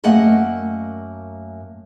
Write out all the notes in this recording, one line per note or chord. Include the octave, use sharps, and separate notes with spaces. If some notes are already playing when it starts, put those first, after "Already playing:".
F#2 A3 A#3 D#5 F#5